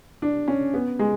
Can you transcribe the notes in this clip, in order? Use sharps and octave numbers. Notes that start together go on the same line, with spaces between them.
D4
C#4
B3
G#3